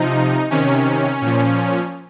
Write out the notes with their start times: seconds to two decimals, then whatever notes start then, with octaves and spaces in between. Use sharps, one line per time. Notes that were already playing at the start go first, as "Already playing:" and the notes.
Already playing: C3 F3 D#4
0.50 C3 D#3 C#4
1.22 A#2 F3